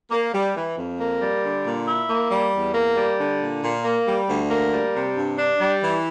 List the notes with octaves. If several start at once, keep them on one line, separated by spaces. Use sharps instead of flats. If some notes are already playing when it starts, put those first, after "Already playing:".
A#3
G3
E3
F2
A#3
G3
D3
A#2
E4
A#3
G3
E2
A#3
G3
D3
A#2
A#2
A#3
G3
D2
A#3
G3
C3
G2
D4
G3
E3